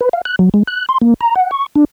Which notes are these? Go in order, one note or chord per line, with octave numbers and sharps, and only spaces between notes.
B4
F5
F#6
F#3
G#3
F#6
C6
A#3
A#5
F#5
C#6
D4